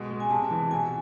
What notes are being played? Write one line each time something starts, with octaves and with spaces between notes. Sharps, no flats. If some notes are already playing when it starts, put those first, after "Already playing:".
Already playing: B2 G#3
G#3
G#5
C3 A5
E3
B2 G#5